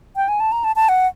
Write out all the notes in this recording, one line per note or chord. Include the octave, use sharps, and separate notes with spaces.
G5
G#5
A5
A#5
A5
A5
F#5